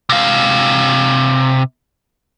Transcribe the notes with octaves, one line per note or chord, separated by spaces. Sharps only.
C3 F5